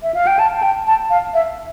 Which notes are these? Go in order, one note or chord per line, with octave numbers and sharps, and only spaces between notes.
E5
F5
G5
A5
A5
G5
A5
F5
E5